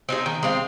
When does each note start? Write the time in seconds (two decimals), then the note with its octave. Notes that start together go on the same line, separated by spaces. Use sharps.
0.09 C4 D#4 G#4
0.26 D#3
0.43 G#3 C4 F4